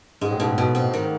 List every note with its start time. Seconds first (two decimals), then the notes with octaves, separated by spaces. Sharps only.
0.21 G#2 G#3
0.31 A2
0.40 G#2 B2
0.58 B2
0.75 C4
0.94 D#3